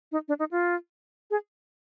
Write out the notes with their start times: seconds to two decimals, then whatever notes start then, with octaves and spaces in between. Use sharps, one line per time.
0.12 D#4
0.28 D4
0.39 D#4
0.51 F4
1.31 G#4